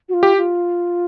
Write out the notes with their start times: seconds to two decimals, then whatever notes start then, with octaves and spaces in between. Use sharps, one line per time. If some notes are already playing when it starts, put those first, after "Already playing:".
0.09 F#4
0.14 F4
0.23 G4
0.37 F4